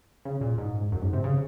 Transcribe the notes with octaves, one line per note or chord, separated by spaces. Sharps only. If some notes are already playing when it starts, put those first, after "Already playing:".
C#3
A#2
G#2
F#2
G#2
C3
C#3